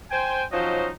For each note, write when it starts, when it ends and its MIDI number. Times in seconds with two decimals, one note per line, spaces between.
0.11 0.44 72
0.11 0.44 79
0.11 0.44 80
0.52 0.90 53
0.52 0.90 54
0.52 0.90 61
0.52 0.90 63
0.52 0.90 72
0.52 0.90 75